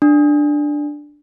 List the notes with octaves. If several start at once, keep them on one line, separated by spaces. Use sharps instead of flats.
D4